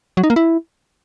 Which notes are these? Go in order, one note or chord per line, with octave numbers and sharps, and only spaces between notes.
F#3
D#4
A#3
E4